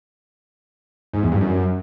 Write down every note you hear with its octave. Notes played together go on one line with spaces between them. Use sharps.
G#2
E2
G2
F#2